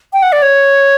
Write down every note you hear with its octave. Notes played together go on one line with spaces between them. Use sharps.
G5
F#5
D5
C#5